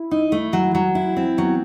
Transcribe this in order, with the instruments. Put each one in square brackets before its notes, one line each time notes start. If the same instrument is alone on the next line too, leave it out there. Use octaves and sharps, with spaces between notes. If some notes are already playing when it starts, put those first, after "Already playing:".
Already playing: [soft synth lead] E4
[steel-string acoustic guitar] D#4
A3
F#3
F#3
E4
C4
[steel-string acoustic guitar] F#3 [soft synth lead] B3